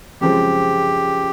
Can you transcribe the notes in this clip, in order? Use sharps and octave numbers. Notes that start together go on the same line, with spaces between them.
F#2 C#3 F3 G#3 C4 G4